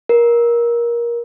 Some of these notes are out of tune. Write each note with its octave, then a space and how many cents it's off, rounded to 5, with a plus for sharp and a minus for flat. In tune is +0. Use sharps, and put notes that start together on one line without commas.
A#4 +20